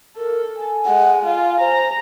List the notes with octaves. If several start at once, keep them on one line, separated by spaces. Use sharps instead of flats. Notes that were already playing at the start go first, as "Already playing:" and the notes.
A4 A#4
G#5
G#3 F#5
F4 F5
C5 A#5